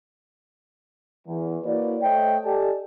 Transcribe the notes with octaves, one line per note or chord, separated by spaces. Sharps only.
E2
A#3 E4 F#4 B4 C#5 D5
A3 C5 C#5 D#5 G5
G4 A4 D5 D#5 G#5 A5